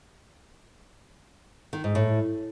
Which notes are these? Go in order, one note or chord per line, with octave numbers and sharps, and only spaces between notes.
D#3
G#2
A2